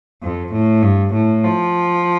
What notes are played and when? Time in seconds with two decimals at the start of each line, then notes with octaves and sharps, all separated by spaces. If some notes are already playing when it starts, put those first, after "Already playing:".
0.23 F2
0.53 A2
0.83 G2
1.14 A2
1.44 F3